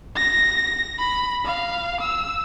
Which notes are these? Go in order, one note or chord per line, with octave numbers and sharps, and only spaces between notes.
A#6
B5
F5
E6